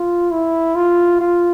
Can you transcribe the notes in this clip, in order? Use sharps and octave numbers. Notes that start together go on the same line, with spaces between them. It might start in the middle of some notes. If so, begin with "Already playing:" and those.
Already playing: F4
E4
F4
F4